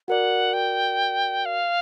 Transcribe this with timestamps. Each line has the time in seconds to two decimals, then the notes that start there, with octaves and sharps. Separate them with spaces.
0.08 F#4 A#4 D5 F#5
0.53 G5
1.45 F5